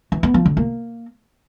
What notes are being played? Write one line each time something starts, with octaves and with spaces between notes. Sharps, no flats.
E3
B3
F3
D3
A#3